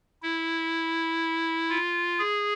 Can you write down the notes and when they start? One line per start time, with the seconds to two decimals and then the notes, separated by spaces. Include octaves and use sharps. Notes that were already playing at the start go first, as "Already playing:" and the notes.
0.22 E4
1.70 F4
2.19 G#4